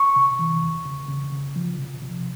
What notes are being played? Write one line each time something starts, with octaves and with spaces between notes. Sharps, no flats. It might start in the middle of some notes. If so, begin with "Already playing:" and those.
Already playing: C#6
C3
E3
E2
C#3
C#3
C#3
F3
C3
C3